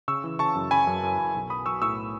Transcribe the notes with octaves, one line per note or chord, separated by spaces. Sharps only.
C#3 C#6 E6
E3
C#3 A5 C#6
F#2
C#3 G#5 B5
F#2
F#2
F#2
B1
B3 B5 D#6
B1 C#6 E6
A2 C#6 E6